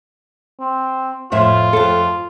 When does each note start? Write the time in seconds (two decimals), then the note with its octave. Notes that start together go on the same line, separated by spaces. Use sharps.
0.60 C4
1.32 F2 A2 F4 E5
1.73 F2 A4